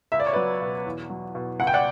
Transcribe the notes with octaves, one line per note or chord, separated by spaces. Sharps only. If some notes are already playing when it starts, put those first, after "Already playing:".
C#2 E5
D5
C#5
F#3 B4 D5
B2
E2
F#3
B2
C#2 F#5
G5
D5 F#5